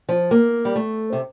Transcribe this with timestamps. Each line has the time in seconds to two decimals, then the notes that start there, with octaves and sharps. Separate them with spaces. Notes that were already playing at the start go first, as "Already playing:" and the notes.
0.09 F3
0.31 A#3
0.65 G3
0.76 A3
1.13 C3